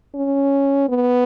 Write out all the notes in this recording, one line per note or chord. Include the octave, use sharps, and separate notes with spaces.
C#4
B3